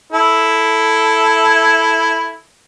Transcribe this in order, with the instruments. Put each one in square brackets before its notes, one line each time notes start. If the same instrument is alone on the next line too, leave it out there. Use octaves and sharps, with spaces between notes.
[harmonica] E4 A4